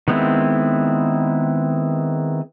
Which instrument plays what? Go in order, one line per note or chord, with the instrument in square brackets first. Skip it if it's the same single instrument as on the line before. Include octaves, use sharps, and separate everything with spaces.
[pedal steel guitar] D#3 G#3 B3 C4 E4